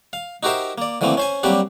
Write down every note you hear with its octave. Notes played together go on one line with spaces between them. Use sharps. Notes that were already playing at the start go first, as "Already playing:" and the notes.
F5
D#4 F#4 G4 A#4 C5 E5
A#3 D5
D3 E3 F3 A3 A#3 C4
C#4 C5 G#5
F#3 G3 A#3 C4 D4 G4